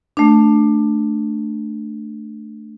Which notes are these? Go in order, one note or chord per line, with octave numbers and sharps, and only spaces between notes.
A3 D4